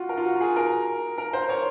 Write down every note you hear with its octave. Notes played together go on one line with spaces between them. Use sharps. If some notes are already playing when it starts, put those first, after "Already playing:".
Already playing: F4 F#4
A#4
F4
F#4
G#4
A#4
A#4
C5
C#5